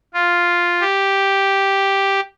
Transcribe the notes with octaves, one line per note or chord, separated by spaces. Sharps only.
F4
G4